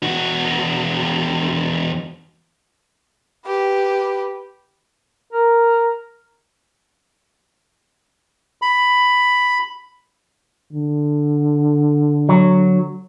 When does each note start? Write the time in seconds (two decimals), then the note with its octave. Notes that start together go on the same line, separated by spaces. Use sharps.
0.03 E2 F#4
3.46 G4 B4
5.33 A#4
8.62 B5
10.73 D3
12.29 F#3